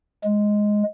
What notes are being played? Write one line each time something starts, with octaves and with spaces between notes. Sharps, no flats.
G#3